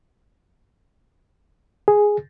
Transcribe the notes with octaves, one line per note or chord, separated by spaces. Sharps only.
G#4